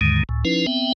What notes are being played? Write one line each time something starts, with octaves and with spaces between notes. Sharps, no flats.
D#2 G#2 D3 D#3 G#3
C#2 A2
F3 C#4 D#4 E4 B4
B3 C4 E5 G5